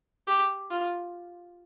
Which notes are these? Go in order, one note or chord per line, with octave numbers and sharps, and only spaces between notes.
G4
F4